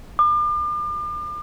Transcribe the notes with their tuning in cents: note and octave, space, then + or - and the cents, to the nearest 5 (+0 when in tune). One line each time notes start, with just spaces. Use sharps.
D6 +40